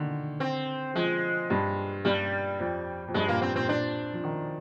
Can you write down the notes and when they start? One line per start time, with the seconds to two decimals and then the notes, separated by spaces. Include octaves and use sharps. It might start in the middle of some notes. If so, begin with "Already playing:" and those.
Already playing: D3 D#3
0.40 C4
0.95 F3 G#3
1.50 G2
2.05 G2 G3
2.60 F2
3.08 F2
3.14 G2 G#3
3.28 A#2 A#3
3.42 C4
3.56 A#2 C4
3.69 A#2 D4
4.13 F3
4.24 D#3